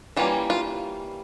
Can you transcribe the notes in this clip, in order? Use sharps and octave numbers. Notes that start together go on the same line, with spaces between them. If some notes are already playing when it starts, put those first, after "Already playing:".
E3 G3 A#3 C#4 F4
F4